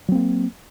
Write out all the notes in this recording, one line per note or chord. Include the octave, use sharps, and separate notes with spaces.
F#3 A#3 C4